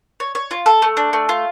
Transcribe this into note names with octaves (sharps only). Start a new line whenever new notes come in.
C#5
C#5
F4
A4
A3
D4
A3
F4